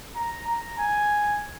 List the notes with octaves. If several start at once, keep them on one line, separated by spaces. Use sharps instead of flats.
A#5
A#5
G#5